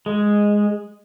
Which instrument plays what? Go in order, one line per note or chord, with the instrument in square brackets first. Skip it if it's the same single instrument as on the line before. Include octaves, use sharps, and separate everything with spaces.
[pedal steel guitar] G#3